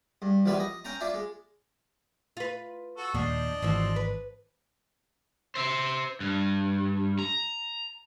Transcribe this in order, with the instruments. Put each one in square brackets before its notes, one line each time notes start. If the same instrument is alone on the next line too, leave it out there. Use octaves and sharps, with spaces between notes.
[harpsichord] G2
A#1 E2 G3 B4 E5 G#5
D#5
C#4 G5 G#5 A#5
D4 F4 E5 G#5
G#3
[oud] F4 B4
[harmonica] F#4 A4
[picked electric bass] D#2 A#2 [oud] D#3 F3 [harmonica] D4 D#5
[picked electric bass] G#1 E3 [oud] F3 C4 F#4
[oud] B4
[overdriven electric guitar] C5 E5
G2
A#5